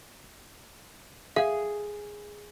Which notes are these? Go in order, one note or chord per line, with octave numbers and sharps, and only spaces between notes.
G#4 E5 F5